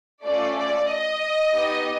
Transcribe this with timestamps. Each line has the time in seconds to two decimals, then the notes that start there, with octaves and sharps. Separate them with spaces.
0.24 A3 C#4 F4 A4 D5
0.57 D5
0.89 D#5
1.52 B3 D#4 G4